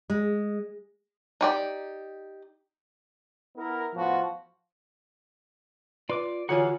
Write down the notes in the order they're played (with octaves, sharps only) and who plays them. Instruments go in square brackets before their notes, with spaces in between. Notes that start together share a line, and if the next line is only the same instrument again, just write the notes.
[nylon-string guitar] G#3
[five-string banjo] D#4 G4 D5
[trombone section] B3 E4 A#4
[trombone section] A2 B3 F#4 [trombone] F3
[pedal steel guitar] F4 D6 [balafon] B4 [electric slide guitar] D5
[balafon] D3 C#5 G#5 [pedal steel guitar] E3 G#4 F#5 [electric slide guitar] F4 F#4